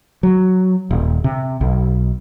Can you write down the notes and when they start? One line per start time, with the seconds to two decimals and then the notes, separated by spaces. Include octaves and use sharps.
0.23 F#3
0.91 D#1
1.24 C3
1.61 B1